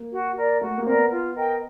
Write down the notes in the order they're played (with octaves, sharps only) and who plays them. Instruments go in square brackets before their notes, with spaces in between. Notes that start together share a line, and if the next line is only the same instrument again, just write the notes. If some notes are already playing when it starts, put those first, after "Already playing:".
Already playing: [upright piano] A#3
[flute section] F#4
A#4 D5
[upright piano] A3 [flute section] F#4
[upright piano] A#3
[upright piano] C4 [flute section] A#4
[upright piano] B3 [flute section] D5
[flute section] F4
A#4 D#5 G5